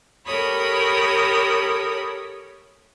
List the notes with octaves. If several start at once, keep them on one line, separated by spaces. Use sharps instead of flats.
G4 A4 A#4 C#5 B5 D#6